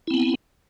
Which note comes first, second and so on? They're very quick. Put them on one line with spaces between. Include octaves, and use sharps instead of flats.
E4 C4 B3